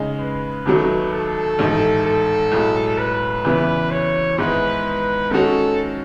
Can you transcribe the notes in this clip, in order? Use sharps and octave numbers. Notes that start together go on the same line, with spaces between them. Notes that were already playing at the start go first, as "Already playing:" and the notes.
Already playing: C#3 G#3 D#4 G#4
B4
D#2 D#3 F#3 A3
A4
A1 G#2 D#3 A3 D#4
A4
B1 A2 G#3
B4
E2 C#3 E3 B3 E4
C#5
G#2 D#3 G#3 B3 E4 B4
D#3 G#3 C#4 F#4 A4